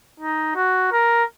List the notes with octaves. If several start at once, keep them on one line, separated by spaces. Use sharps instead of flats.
D#4
F#4
A#4